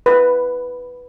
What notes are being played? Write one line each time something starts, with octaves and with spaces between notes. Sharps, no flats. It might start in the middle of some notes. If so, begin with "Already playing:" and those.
B4